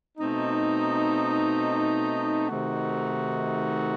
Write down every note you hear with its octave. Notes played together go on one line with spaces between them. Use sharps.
B2 A3 C4 D#4
C3 D#3 A3 D#4 F#4